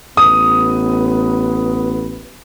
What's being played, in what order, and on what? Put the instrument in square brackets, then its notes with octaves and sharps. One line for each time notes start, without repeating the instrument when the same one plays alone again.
[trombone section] A1 B3 B4 [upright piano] D#6